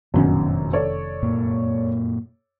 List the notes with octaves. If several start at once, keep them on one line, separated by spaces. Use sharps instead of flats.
F1 A#1 F#2 B2 D#3 C#4
A4 C#5 D5
F#2 A#2 A#3